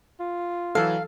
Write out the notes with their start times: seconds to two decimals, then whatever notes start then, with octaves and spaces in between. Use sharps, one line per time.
0.19 F4
0.75 E3 F#3 A4 F5